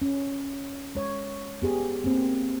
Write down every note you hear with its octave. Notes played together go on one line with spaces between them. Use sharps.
C#4
G#3 C#5
B3 G4 G#4
A#3 C4